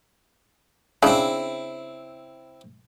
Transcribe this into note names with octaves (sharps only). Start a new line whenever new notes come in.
C#3 C4 D4 E4